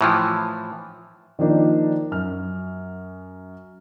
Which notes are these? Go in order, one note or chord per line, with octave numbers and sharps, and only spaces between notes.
A2 E3 F3
D#3 F3 A#3 D4 D#4
F#2 F6